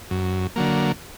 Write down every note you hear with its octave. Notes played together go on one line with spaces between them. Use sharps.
F#2
D3 F#3 A#3